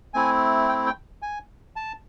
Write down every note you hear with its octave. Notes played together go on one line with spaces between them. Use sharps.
A3 C4 E4 G#5
G5
G5
G#5
A5